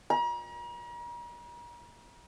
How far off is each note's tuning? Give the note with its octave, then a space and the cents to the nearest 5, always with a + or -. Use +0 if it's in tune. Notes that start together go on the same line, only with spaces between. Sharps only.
A#5 +40